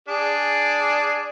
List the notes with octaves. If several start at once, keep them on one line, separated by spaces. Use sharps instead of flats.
D4 G#4